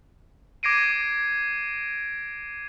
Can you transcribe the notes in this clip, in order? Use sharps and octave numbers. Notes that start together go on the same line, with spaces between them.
D6 G#6 A#6 C7 D7 D#7